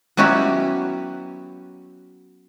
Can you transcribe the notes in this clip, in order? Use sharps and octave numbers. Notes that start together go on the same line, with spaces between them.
F#3 B3 C#4 E4 F#4 G4